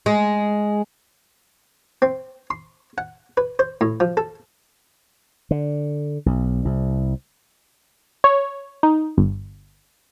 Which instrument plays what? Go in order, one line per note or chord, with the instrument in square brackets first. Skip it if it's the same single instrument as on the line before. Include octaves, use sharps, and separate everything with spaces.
[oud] G#3
[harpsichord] C4
C6
F#5
B4
C5
A2
F3
A4
[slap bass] D3
B1
C2
[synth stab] C#5
D#4
G1